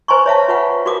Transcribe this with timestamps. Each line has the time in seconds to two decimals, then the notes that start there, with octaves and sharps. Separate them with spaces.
0.08 B4 C5 G#5 A#5 C6 C#6
0.26 C#5 E5 F5 A5
0.48 F4 B4 F5 F#5
0.85 F4 F#4 A#4 F5 D6 D#6